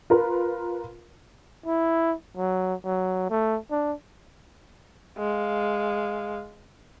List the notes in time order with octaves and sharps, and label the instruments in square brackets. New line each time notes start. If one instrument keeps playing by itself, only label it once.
[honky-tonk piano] F4 A#4 B4
[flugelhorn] E4
F#3
F#3
A3
D4
[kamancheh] G#3 F5